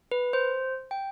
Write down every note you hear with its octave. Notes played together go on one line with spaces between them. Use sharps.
B4
C5
G5